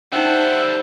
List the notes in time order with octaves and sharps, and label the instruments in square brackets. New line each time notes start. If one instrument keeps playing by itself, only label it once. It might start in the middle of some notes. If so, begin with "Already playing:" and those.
[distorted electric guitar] G3 A4 [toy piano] C#4 D#4 [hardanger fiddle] C5 [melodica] E5 F#5